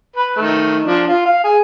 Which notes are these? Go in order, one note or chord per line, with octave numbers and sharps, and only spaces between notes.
B4
D#3 A3
F3 D4
F4
F5
G#4